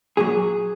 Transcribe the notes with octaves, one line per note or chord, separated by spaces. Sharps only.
A#2 F#3 G#4